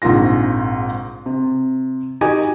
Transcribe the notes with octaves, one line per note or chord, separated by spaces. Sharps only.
A#1 G#2 C3 F4 A#6
C3
D#4 F#4 G4 D#5 G#5